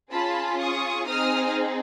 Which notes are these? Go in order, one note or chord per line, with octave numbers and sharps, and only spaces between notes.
C#4 F4 G#4 A5 B5
C#6 D#6
C4 D#4 G#4 D#6 F6